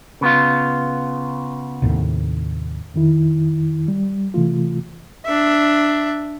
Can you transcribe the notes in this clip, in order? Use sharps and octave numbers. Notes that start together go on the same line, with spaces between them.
C#3 B3 F4
D#2 A2 C3
F2 D#3 E4
G3
C3 E3 A3 F4
D4 E5